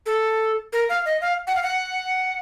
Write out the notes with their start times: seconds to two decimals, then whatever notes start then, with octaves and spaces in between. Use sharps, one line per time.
0.06 A4
0.73 A#4
0.89 F5
1.06 D#5
1.21 F5
1.47 F#5
1.55 F5
1.63 F#5